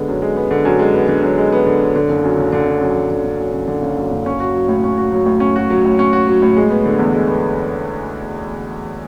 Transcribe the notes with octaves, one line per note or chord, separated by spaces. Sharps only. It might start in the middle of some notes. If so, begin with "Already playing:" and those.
Already playing: D3 G#3 B3
F#2
G#3
B3
D3
F#2
G#3
B3
D3
F#2
G#3
B3
D3
F#2
D3
F#1
F#2
F#1
D3
F#1
F#2
F#1
D3
F#1
F#2
F#1
D3
F#1
F#2
F#1
C#4
F#4
F#3
A2
C#4
F#4
F#3
A2
C#4
F#4
F#3
A2
C#4
F#4
F#3
A2
G#3
B3
D3
E2
G#3
B3